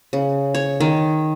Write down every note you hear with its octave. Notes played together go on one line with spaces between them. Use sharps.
C#3
C#5
D#3